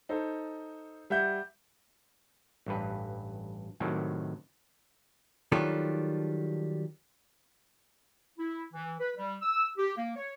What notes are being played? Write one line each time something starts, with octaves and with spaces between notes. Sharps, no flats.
D#4 A4 C5
G3 E5 F#5 G6
A1 G2 B4
A2 C3 D#3 F#3
D#3 F#3 G3 D4 F4 A4
E4
E3
B4
G3
E6
G4
A#3
C#5